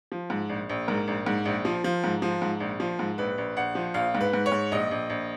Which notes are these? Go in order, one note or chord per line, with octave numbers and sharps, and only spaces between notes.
F3
G#2
A#1
A#1
G#2 A#4
A#1
G#2
A#1
F3
F3
G#2
F3
G#2
A#1
F3
G#2
A#1 B4
A#1
A#1 F#5
F3
A#1 F5
G#2
B4
G#2
C#5
G#2
A#1 D#5
A#1
A#1